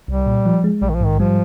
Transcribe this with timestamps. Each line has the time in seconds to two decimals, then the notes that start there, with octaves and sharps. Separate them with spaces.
0.08 C2 G3
0.27 A#2
0.45 F3
0.64 G#3
0.82 A#1 G3
0.89 D#3
0.95 F3
1.01 G#2
1.06 D#3
1.19 F3 G3